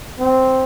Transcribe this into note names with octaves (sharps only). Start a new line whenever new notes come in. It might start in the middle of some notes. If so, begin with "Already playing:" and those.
C4